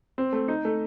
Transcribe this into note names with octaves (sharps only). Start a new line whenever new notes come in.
C4
A3
D#4
A3